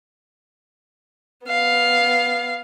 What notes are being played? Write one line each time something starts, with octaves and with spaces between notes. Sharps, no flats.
B3 F5